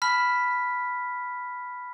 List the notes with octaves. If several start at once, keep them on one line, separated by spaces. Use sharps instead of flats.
A5 B5 F6 B6